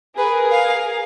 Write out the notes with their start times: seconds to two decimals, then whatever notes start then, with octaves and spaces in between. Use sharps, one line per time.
0.17 G#4 A#4 B4
0.52 F5